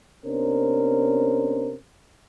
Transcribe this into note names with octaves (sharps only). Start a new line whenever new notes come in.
C3 B3 C#4 D4 A#4 C5